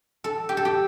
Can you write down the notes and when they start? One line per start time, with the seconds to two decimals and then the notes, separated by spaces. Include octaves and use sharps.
0.24 A4
0.49 G4
0.57 A4
0.65 G4